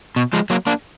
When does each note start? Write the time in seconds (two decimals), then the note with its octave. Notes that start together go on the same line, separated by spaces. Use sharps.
0.16 B2
0.33 F3 G#3
0.50 F#3 A#3
0.67 A#3 D4